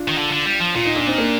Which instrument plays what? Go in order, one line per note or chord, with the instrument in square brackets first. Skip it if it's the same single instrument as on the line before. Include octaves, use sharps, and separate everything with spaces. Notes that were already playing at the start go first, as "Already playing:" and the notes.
Already playing: [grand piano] D4 F4
[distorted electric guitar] D#3
D3
D3
G3
F3
[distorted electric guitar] A#2 [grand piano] F4
[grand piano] D#4
D4
C4 D#4
A#3 D4